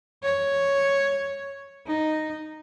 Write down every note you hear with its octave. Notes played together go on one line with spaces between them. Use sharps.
C#5
D#4